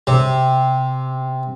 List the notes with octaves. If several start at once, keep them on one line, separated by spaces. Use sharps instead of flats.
C3